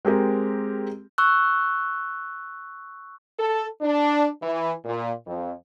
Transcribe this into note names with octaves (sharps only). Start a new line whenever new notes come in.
G#3 C4 G4 A#4
C#6 E6 F#6
A4
D4
E3
A#2
F2